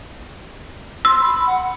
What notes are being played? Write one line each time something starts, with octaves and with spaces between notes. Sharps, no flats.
C6 E6
B5
B5
F#5